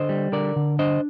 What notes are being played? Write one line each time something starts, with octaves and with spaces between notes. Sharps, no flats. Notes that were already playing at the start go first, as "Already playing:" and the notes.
Already playing: D3 C5 D#5
G3
D3 A#4 D5
D3
D4 C5 D#5